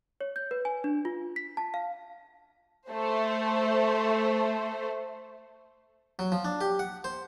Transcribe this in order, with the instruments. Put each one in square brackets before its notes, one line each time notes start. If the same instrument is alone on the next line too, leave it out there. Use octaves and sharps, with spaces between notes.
[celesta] C#5
G6
B4
G#5
D4
F4
B6
A5
F5
[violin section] A3 C5
[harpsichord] F#3
F3
D4
G4
F#5
C5